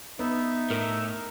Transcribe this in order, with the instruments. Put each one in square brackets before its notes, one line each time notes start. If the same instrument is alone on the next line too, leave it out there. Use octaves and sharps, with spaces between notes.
[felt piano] B3 [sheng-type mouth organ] D#4 E5
[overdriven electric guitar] A2 [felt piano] A#4